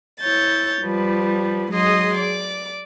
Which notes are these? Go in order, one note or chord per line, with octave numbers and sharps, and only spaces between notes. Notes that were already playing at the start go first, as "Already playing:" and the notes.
E4 C#5 G6 A6
F3 G3 B4
G#2 F#3 G#4 D#5 C6 D#6
D5 D6